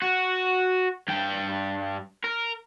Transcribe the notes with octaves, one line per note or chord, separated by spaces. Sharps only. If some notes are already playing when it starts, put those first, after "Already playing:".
F#4
G2 G5
A#4